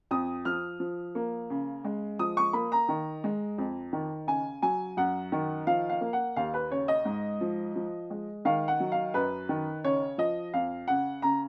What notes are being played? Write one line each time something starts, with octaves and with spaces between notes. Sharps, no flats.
F2 D#6
F3 F6
F3
A#3
C#3
G#3
F3 D#6
C#6
A#3 B5
A#5
D#3
G#3
F2
D#3
C#3 G#5
F#3 G#5
F#2 F#5
D#3
F3 F5
F5
A#3
F#5
D#2 F5
B4
C#3 C#5
D#5
G#2
F3
F3
G#3
D#3 F5
F#5
F#3
F5
F#2 B4
D#3
C#3 C#5
F3 D#5
F2 F5
C#3 F#5
C#3 A#5